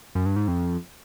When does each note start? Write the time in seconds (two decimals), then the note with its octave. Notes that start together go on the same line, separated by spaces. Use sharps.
0.15 F#2
0.26 G2
0.36 G#2
0.48 F2